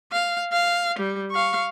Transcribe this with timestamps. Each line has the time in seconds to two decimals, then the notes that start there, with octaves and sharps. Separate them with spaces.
0.12 F5
0.53 F5
0.99 G3
1.31 F5 C#6